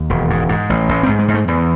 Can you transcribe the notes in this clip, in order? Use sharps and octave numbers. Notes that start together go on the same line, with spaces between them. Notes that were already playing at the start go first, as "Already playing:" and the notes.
Already playing: D#2
E1
G#2
G#2
A1
A1
C4
G#2
G#3
G#2
A3
E2